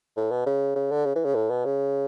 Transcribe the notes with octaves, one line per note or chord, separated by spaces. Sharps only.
A2
B2
C#3
C#3
D3
C#3
E3
C#3
A2
B2
C#3